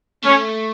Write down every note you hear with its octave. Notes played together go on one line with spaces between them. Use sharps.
A3 C#4